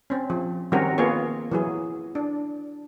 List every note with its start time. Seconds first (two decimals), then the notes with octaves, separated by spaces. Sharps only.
0.10 C4 C#4
0.30 F3
0.72 D#3 G3 C4 C#4 F#4 A#4
0.98 A#3 B3 F4 G#4 C#5
1.52 E3 F#3 G#4
2.15 D4